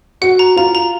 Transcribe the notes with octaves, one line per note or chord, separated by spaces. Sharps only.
F#4 F#5
A#5
F4 A#5
A#5